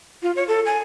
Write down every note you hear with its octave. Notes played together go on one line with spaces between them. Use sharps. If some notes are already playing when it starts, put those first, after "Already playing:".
F4
C#5
A4
G#5